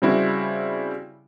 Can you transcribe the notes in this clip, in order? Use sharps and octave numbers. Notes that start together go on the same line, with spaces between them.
C#3 G3 C4 E4 F#4